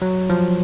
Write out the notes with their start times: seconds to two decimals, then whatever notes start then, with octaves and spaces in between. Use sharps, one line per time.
0.02 F#3
0.30 F3